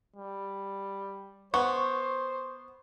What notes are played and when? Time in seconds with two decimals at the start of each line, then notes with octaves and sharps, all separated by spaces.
0.16 G3
1.54 B3 C5 C#6